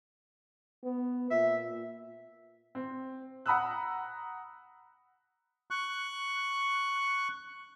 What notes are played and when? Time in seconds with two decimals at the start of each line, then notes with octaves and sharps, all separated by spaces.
0.83 B3
1.31 A#2 E5
2.75 C4
3.46 F#5 A#5 B5 D#6 E6 F#6
5.71 C#6 F#6